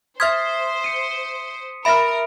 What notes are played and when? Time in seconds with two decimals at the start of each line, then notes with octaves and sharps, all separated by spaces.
0.20 C5 E5 C6 D#6 F6 G#6 B6
0.84 C#7 D#7
1.85 A#4 E5 B5 F6 A#6 D7